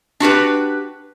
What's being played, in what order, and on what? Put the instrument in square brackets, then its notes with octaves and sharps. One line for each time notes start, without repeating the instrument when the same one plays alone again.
[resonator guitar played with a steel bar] D4 F#4 G4 B4